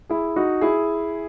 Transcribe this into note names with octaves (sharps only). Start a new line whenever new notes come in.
E4 G#4
D#4 F#4
E4 G#4